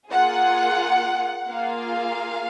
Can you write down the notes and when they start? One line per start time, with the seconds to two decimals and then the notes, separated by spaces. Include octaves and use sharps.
0.10 A#3 F4 G#4 F#5
1.50 A#3 F4 G#4 F5